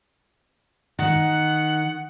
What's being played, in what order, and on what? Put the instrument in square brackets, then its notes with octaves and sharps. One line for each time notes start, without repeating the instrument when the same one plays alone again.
[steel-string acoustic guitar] D#3 [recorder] F#5